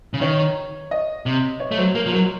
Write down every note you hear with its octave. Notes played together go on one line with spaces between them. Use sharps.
C#3
D#3 C#5
D#5
C3
C#5
A3
F#3 C5
A#3 A#4
F3
F#3 A#4